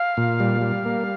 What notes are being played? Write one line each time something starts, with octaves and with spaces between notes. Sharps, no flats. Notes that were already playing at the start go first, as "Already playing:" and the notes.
Already playing: F5
A#2
G3
G3
A#3